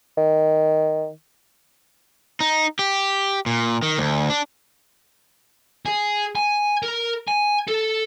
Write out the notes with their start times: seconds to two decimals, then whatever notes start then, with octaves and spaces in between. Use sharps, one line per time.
0.17 D#3
2.40 D#4
2.79 G4
3.46 A#2
3.82 D#3
3.98 D2
4.30 D4
5.86 G#4
6.36 G#5
6.83 A#4
7.28 G#5
7.68 A4